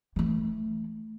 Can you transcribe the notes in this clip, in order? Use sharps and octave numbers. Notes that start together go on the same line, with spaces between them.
E3 A3